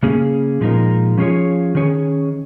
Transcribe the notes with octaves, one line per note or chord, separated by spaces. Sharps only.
C#3 A#3 C#4 G#4
A#2 F3 G#3 D#4 A#4
F3 C#4 F4 G#4 C#5
D#3 C#4 G#4 C#5